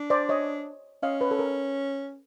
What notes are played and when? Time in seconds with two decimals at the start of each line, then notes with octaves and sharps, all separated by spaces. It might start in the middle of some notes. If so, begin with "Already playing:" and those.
Already playing: D4
0.10 C5 D5
0.29 C#5 D#5
1.03 C#4 D#5 F5
1.21 B4
1.31 A4
1.39 A#4